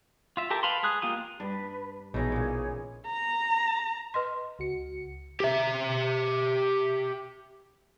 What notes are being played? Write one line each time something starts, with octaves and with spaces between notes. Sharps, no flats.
F4 E5
G4 A4 A#4 E5 G5
B4 F5 A5 B5 C6
G#3 G#4 D#6 F#6
A#3 F4 G4 D#6
G2 D4 B4
A#1 B2 E3 D#4 G#4 C#5
A#2 C#3
A#5
B4 D#5 C6
C#2 F#4 C#7
G4 E5